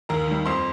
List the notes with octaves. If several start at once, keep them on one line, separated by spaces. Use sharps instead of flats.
D#2 A#4 A#5
D#3 G3
F2 C5 C6